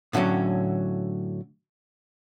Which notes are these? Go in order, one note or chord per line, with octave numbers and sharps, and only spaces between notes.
A2 D3 F3 F#3 C#4